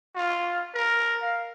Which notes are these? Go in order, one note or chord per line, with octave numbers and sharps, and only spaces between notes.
F4
A#4
F5